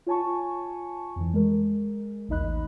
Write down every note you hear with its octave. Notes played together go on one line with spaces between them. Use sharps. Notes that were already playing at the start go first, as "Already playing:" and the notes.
F4 C#5 G#5 A5 C#6
F2 E3
G#3 A#4
A1 D#2 D#4 D#5 B5 F#6